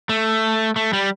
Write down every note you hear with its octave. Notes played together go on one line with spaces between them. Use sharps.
A3
A3
G3